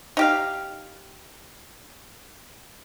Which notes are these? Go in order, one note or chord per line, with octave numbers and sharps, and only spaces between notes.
D#4 G4 F5